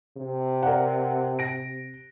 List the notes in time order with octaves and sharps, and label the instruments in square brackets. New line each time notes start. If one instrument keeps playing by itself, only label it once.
[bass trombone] C3
[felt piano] A#4 D5 F#5
A#6 D7